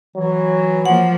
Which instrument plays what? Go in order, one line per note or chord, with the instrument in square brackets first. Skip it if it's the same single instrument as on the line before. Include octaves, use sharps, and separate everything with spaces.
[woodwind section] E3 [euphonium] F#3
[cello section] F3 A#3 [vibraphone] F#5